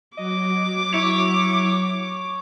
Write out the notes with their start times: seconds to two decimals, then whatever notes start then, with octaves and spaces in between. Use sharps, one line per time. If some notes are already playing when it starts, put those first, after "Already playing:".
0.18 F#3 D#5 D6
0.94 E4 C#5